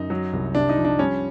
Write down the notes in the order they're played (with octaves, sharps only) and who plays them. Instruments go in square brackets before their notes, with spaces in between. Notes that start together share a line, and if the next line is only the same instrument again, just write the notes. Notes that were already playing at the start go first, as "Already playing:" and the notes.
Already playing: [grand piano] F#2 D#4
F#3
C2
C3 D4
D#4
F3
D4
G3 C#4